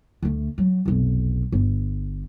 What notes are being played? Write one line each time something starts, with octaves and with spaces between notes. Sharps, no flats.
D2 A3
F#3
F1 B1
G1